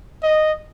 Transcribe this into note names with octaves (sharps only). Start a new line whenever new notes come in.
D#5